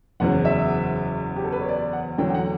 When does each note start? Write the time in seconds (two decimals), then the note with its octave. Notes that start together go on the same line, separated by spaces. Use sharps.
0.20 F#1 E2 C#3 F#3 F#5
0.45 E5
1.36 G4
1.44 A4
1.52 B4
1.61 C#5
1.69 D5
1.93 F#5
2.18 E2 D3 F#3 G5
2.29 G5
2.34 F#5